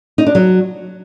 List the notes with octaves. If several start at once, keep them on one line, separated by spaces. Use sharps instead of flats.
D#4
D4
F#3